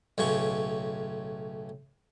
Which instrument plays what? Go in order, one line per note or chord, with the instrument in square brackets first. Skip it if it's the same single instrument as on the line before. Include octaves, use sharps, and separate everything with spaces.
[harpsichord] B1 A2 C#3 C#6